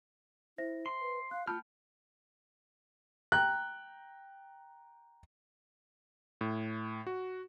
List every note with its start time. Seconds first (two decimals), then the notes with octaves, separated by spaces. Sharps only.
0.58 E4 C5 E5 A#6
0.86 C6
1.01 B4
1.31 F5 F#6
1.47 A3 F4 G5 A5 B5 F6 G6
3.32 G5 A#5 F#6
6.41 A2
7.07 F#4